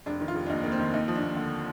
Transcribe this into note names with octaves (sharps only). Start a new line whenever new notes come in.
F1 D4
D#3
F4
F1
D4
D#2 D#4
F1 A#3
C4
D#3
D#2 D#4
F3
D4
D#2
D3